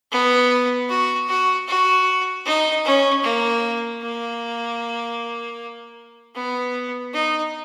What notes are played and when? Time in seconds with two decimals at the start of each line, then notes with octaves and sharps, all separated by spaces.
0.12 B3
0.89 F#4
1.29 F#4
1.68 F#4
2.45 D#4
2.85 C#4
3.23 A#3
4.02 A#3
6.35 B3
7.13 D#4